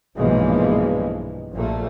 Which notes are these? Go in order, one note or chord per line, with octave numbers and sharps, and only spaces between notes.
B1 G2 A#2 E3 F3 G#3
A#1 A#2 A3